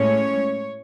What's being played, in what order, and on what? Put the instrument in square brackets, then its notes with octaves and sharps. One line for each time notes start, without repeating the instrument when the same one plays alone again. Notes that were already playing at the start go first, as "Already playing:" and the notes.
Already playing: [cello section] A2 G#3 C#4 C#5